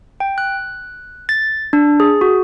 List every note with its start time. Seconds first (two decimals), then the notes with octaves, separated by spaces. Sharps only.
0.20 G5
0.38 F#6
1.29 A6
1.73 D4
2.00 G#4
2.21 F#4